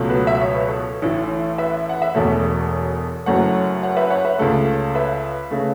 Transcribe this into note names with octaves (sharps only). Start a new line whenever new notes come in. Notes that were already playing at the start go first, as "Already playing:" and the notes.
Already playing: C#2 B2 F#3 A3
F#4 B4
E5
C#5
B4
A4 C#5
A1 A2 E3
B4 E5
F#5
E5
E1 E2 B2 A3 A4 C#5
F#1 F#2 F#3 A3 C#5 F#5
C#5 F#5
B4 E5
C#5 F#5
B4 E5
C#2 C#3 A3 A4 C#5
B4 E5
C#3 A3